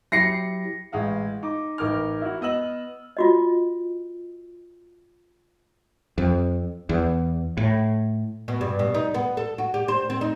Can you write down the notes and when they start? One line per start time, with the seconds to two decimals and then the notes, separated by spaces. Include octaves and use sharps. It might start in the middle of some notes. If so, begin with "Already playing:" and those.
0.12 F#3 E4 G4 A#6 C7 C#7
0.92 A1 G#3 F5 F#5
1.43 D#4 D6
1.78 A1 D#4 A#4 D6 F6
2.21 E4 F#4
2.41 B3 D#5 E6 F#7
3.17 F4 F#4 D#5
6.18 F2
6.89 E2
7.57 A2
8.48 B2
8.61 G2
8.79 B2
8.95 D#4
9.14 B3
9.37 A4
9.58 F#4
9.74 G4
9.88 C5
10.10 C4
10.21 D#4